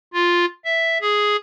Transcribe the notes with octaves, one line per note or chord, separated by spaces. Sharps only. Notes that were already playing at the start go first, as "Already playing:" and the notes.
F4
E5
G#4